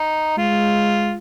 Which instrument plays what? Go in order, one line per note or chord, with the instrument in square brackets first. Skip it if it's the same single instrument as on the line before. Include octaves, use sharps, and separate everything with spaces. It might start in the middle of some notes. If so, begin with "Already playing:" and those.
Already playing: [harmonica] D#4
[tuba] G#3 [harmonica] F4